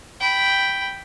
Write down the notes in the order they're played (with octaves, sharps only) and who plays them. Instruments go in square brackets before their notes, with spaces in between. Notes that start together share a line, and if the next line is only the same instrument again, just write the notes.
[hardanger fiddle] G5 B5